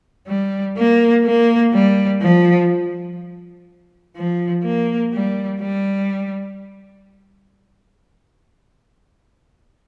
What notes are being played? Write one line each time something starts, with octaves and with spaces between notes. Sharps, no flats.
G3
A#3
A#3
G3
F3
F3
A#3
G3
G3